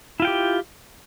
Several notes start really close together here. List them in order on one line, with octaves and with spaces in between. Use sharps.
E4 F4 G5 G4